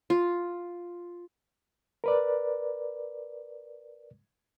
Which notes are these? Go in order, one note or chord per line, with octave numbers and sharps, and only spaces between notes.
F4
A#4 B4 D5